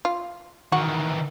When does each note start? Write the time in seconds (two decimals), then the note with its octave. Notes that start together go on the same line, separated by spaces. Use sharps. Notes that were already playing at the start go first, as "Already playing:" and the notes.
0.05 F4
0.72 D#3 E3 F#4